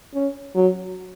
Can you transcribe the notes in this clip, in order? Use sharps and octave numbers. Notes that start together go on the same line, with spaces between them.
C#4
F#3